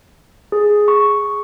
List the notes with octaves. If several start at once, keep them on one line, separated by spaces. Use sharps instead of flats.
G#4
C#6